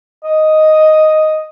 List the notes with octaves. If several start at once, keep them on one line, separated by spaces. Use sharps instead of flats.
D#5